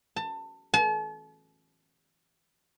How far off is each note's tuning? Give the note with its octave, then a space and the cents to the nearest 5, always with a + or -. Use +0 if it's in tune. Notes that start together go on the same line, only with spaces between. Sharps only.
A5 +25
A5 -40